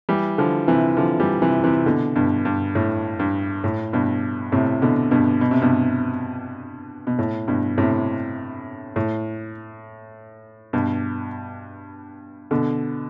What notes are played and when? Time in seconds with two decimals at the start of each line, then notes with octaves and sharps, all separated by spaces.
0.09 E3 G3
0.38 D3 F3
0.68 C3 E3
0.97 D3 F3
1.20 E3 G3
1.42 C3 E3
1.64 C3 E3
1.86 B2 D3
2.16 G2 B2
2.45 G2
2.75 A2
3.19 G2
3.64 A2
3.93 G2 B2
4.52 A2 C3
4.82 B2 D3
5.11 G2 B2
5.41 B2
5.51 C3
5.62 G2 B2
7.07 B2
7.19 A2
7.48 G2 B2
7.78 A2 C3
8.96 A2
10.73 G2 B2
12.51 B2 D3